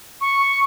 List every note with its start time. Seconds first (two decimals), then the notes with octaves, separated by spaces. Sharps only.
0.21 C#6